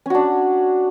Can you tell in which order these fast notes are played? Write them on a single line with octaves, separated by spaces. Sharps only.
C#4 F#4 D4